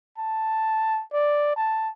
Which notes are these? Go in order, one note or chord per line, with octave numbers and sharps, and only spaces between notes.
A5
D5
A5